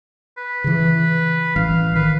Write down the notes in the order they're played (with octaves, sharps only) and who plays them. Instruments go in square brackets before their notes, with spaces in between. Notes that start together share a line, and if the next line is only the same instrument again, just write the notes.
[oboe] B4
[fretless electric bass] C#3 E3
[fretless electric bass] A1 E3 [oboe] F5
[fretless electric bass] D#3 [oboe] B4